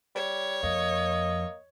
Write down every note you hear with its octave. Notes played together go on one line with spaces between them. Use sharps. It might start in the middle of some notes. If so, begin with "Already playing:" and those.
G3 C#5
F2 A#3 D#5